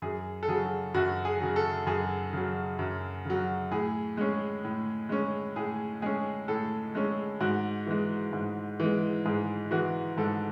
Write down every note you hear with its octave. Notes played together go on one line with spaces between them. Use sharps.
F#2 G#4
A4
C#3 F#3 G#4
F#2 F#4
G#4
C#3 F#3
A4
F#2 G#4
C#3 F#3
F#2
C#3 F#3
A2 G#4
G#3 C#4
A2
G#3 C#4
A2 G#4
G#3 C#4 G#4
A2 A4
G#3 C#4
G#2 F#4
E3 G#3
G#2
E3 G#3
G#2 G#4
E3 G#3 F#4
G#2 A4